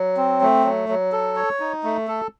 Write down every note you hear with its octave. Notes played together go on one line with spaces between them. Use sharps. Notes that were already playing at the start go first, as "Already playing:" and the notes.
Already playing: F#3
C4
A3
F#3
F#3
A4
C#5
D#4
A3
A4